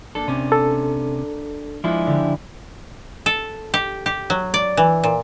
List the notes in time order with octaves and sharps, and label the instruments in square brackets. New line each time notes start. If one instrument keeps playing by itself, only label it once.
[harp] A#3 D4 A6 [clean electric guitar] A4
[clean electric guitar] C3 C#4
[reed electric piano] A4
[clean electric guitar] F3 E4 [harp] G#3 D4 F4
[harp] D3 G4
[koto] A4
G4
G4
F#3
D5
E3
A#2